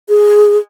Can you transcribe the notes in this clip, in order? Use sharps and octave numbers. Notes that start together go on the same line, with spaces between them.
G#4